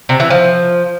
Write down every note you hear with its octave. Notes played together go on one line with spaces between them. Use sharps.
C3
E3
F3